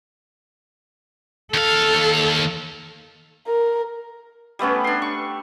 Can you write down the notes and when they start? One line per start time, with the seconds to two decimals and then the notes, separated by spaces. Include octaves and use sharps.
1.54 D#2 A4 F5
3.48 A#4
4.59 G3 A3 B3 C#4
4.84 D4 C6
5.02 C#6